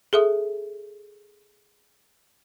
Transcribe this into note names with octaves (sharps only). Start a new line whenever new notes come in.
G#4 A4 E5 D#6